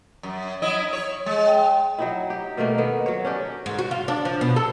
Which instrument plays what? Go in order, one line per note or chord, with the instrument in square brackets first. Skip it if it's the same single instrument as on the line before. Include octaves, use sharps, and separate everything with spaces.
[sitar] F#2
F#3 E4 D#5
C#5
G#3
[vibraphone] G5
[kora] F#3 D#4 E4
G4
B2 D#3 A3 A#3
D#3 B3
F#3 C#5
C#4 D4 G4
[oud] G#2
F#4
F4
D4
F3
B2
A4